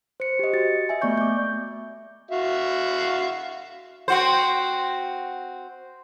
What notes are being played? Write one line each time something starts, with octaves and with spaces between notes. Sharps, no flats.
C5 C#7
G4 D#5
F#4 A6 C#7
D#5 E5 G#5
A3 B3 D5 C#6 G6
D6 G6
F#4 E5 F5
C4 F#4 C5